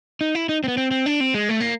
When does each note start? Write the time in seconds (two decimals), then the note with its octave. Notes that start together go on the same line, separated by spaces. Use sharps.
0.21 D#4
0.35 E4
0.49 D#4
0.64 C4
0.68 B3
0.77 C4
0.91 C4
1.06 D4
1.20 C4
1.34 G#3
1.49 A3
1.60 A#3